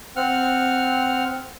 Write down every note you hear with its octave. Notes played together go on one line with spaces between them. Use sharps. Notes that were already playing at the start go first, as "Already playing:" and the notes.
C4 F#5 F6